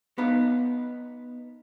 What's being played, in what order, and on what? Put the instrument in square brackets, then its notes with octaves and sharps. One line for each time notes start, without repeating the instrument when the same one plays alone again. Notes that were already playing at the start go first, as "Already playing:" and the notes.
[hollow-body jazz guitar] B3 D#4 B4 F5